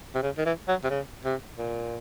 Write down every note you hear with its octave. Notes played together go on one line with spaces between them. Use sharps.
C3
C#3
D#3
E3
F#3
C3
C#3
C3
A#2